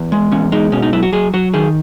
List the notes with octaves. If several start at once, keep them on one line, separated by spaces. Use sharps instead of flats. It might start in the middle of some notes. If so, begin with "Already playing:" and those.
Already playing: E2
G#3
E2 C#4
G#3 D#4
B2 C#4
D#4
F#3 E4
F#4
F#3 G#4
F#3 F#4
D#3 G#4